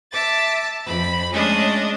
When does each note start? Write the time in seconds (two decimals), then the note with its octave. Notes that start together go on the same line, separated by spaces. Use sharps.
0.12 E5 A5 D6 A6
0.85 F2 B5
1.32 G#3 A3 C#4 D4 D#5